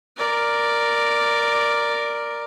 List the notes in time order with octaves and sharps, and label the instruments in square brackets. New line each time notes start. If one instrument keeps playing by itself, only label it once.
[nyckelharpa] A#4 D5